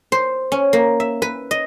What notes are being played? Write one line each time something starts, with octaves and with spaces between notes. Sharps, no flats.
C5
C#4
A#3
E5
B4
D#5